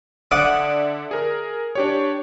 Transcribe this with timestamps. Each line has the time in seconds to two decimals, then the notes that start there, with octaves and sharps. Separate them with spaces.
0.31 D3 D5 E5 F#5 D6 D#6
1.11 G#4 A#4
1.75 D4 G4 C#5